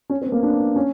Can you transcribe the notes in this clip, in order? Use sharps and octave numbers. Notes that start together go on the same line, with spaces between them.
C#4
C4
B3
A#3
D4
C#4